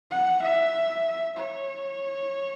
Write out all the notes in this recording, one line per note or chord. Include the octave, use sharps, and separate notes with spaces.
F#5
E5
C#5